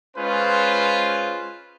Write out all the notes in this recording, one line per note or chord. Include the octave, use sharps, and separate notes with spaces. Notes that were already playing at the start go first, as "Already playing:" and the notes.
G#3 C#4 F4 B4 C5